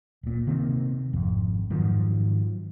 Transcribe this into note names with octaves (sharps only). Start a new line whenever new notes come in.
D1 A#2
C3 D#3 A#3 C4
G#1 F2
G#2 D#3 F3 F#3